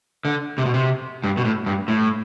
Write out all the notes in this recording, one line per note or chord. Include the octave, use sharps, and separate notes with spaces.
D3
C3
B2
C3
G2
B2
A2
G2
A2